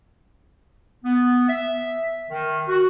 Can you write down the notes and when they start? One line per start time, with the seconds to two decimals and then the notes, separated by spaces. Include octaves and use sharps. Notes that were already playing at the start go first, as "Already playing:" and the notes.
1.04 B3
1.48 E5
2.30 D#3
2.68 F#4